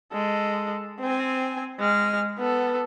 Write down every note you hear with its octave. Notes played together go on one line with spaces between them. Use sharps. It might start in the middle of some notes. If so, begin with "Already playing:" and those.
G#3 A4
C4 G#5
G#3 F6
B3 A4